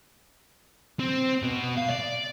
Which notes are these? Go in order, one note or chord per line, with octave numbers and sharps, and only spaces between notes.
C4
B2
F5
D5